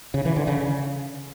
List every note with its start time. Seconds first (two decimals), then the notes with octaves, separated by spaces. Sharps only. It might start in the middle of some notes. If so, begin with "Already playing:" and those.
0.14 C#3
0.25 E3
0.36 D3
0.48 C#3